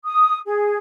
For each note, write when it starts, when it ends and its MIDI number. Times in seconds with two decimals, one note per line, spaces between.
0.05 0.39 87
0.46 0.77 68